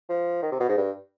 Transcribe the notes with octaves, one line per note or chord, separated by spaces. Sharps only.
F3
D#3
C3
B2
G#2
G2